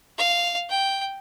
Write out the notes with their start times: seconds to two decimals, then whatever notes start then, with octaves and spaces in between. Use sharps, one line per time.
0.18 F5
0.70 G5